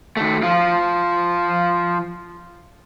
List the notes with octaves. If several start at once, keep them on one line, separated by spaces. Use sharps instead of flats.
D#3 A3
F3 F4